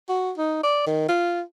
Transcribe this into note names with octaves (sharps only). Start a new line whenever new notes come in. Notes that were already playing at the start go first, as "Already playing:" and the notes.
F#4
D#4
D5
D#3
F4